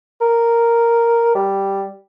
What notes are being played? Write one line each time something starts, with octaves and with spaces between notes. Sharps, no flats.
A#4
G3